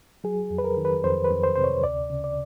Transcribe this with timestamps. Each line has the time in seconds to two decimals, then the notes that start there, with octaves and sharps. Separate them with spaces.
0.24 F#3 G#4
0.50 F2
0.58 B4
0.64 A#4
0.77 D#3
0.85 B4
1.04 F2 C5
1.25 B4
1.31 F2
1.44 C5
1.56 C3 C5
1.64 C#5
1.84 D2 D5
2.10 C#3
2.24 D5